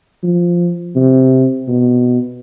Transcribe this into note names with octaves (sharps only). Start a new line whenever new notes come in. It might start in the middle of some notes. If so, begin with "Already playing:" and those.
F3
C3
B2